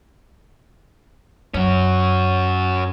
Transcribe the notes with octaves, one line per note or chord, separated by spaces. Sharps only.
F#2 C#4 F#4